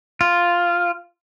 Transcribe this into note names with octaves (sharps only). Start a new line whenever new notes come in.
F4